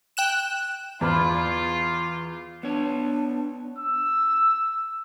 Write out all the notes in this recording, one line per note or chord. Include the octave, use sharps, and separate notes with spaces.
G5 F#6 E7
E2 F4 D5 F5 B5
B3 D4 C#5
E6